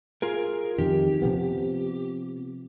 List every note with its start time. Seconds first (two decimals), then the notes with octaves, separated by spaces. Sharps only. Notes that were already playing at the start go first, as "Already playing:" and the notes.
0.22 F4 G#4 A#4
0.78 F2 D#3 G4
1.22 C3 F3 B3